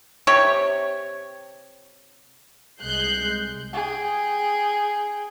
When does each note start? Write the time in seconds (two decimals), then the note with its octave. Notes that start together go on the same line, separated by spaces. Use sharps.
0.27 C3 G4 C#5
2.82 C2 G#3 F#6 G6 C7
3.73 G#4 G5